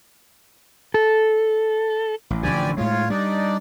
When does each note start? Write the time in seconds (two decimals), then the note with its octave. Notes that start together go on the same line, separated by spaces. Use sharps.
0.94 A4
2.30 A1
2.43 A1 D3 F3 G4 D5 G#5
2.78 A2 G#3 F4 C#5
3.10 G3 D4 D#4 D5